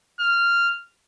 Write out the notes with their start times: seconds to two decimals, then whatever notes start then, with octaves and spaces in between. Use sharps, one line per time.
0.20 F6